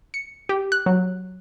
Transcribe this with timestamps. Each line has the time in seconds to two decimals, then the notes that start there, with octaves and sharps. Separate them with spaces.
0.14 C#7
0.49 G4
0.72 F#6
0.86 F#3